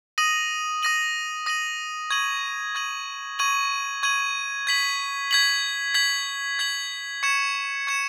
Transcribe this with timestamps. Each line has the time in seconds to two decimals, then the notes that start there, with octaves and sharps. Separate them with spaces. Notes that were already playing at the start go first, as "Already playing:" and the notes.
0.18 D#6 A#6 D#7 F#7
0.83 D#6 A#6 D#7 F#7
1.46 D#6 A#6 D#7 F#7
2.10 C#6 G#6 D#7 F#7
2.75 C#6 G#6 D#7 F#7
3.39 C#6 G#6 D#7 F#7
4.03 C#6 G#6 D#7 F#7
4.67 G#6 B6 F#7
5.31 G#6 B6 F#7
5.94 G#6 B6 F#7
6.59 G#6 B6 F#7
7.23 C#6 G#6 C#7 E7
7.87 C#6 G#6 C#7 E7